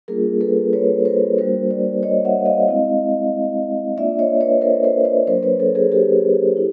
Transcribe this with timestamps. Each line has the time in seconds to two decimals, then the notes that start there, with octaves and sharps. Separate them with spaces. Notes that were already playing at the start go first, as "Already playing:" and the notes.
0.08 G3 A#3 D4 F4 G#4 A#4
0.41 A4 B4
0.73 B4 C#5
1.05 A#4 C5
1.38 G3 A#3 D4 F#4 A#4 C5
1.70 C5 D5
2.03 C#5 D#5
2.25 E5 F#5
2.46 D#5 F5
2.68 G#3 C4 E4
3.97 A#3 D4 F4 D5 E5
4.19 C#5 D#5
4.41 B4 C#5
4.62 A#4 C5
4.83 A#4 C5
5.05 C5 D5
5.27 F#3 A#3 D4 A#4 C5
5.43 B4 C#5
5.60 A4 B4
5.75 G#4 A#4
5.91 G4 A4
6.57 E4